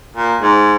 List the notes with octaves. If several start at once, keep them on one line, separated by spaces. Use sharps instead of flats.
A#2
G#2